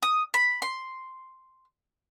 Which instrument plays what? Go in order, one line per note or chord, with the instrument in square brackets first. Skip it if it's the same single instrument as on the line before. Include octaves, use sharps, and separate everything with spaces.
[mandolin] D#6
B5
C6